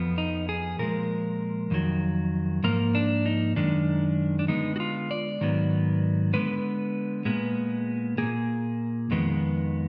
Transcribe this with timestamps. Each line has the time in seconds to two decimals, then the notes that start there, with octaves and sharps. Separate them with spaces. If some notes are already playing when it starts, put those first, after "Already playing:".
Already playing: F2 F3 B3
0.18 D#4
0.49 G#4
0.79 A#2 F3 G#3 A#4
1.71 F2 D#3 F#3
2.64 G#2 F3 A#3 A#4
2.95 D4
3.26 D#4
3.56 F#2 D#3 G#3 D4
4.39 D4
4.48 D3 G#3 B3 D#4
4.76 F#4
4.80 F4
5.11 D5
5.41 G#2 D#3 F#3 B3
6.33 D3 G#3 B3 B4
7.25 A#2 G#3 B3
8.18 A#2 F3 A#3 G#4
9.11 F2 D#3 G#3 B3